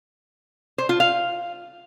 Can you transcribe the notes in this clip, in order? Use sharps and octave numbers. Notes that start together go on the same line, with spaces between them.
C5
F4
F5